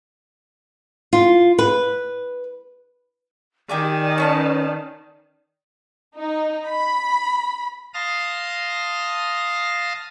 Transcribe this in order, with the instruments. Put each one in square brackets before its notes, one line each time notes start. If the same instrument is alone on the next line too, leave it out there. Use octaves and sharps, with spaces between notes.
[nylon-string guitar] F4
B4
[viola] D#3 [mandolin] G4 G#5 D6 [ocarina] D5
[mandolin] C#4 B4 A5
[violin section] D#4
B5
[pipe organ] F5 A5 C6 D#6 F6 A#6